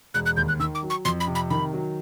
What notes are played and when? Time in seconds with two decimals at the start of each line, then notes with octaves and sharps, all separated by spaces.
0.14 E1 F#6
0.26 F#6
0.37 D#2 G6
0.48 F#6
0.59 D#3 E6
0.75 D6
0.83 F#3
0.90 C#6
1.05 F2 C6
1.20 B5
1.27 C3
1.35 B5
1.50 D#3 B5
1.73 F#3